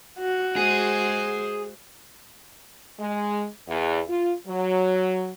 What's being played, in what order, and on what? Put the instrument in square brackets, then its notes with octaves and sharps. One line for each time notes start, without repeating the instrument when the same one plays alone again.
[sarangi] F#4
[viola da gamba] G#3 C5 [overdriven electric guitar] G#4
[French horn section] G#3
E2
F4
F#3